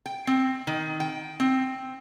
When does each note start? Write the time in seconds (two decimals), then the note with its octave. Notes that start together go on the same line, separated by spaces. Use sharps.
0.06 G5
0.27 C4
0.67 D#3
1.00 G5
1.40 C4